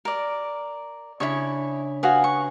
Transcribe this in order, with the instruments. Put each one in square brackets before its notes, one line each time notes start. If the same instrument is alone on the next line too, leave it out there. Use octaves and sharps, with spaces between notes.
[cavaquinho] A#4 D5
[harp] C#3 D4 [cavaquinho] E4 C#5 C#6
[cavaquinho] F#4 F5 D#6 [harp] B4 F#5 G#5
[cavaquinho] C#6